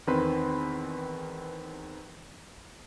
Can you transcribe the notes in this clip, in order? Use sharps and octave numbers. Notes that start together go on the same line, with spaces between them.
E2 D#3 C4 B4 B5 C6